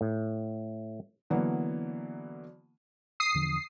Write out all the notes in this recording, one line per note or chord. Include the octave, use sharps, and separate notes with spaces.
A2
D3 E3 F#3 A#3 B3
D#6 C7
E2 D3 F3